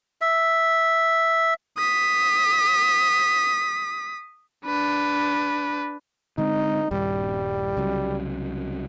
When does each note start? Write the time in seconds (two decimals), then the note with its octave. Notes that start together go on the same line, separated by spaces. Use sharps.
0.21 E5
1.77 D#6 B6
4.66 D4 B4
6.38 D3 G#3 C4 D#4
6.91 D#1 G2 G3
7.77 C2 C#3 F#3